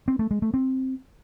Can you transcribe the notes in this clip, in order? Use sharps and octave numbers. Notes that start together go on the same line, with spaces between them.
C4
A3
G#3
A3
C4